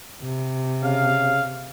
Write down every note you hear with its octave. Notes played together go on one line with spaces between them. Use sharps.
C3
C#3 F5